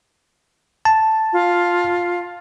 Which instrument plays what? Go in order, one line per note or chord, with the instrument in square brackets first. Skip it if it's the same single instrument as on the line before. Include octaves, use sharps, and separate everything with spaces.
[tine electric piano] A5
[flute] F4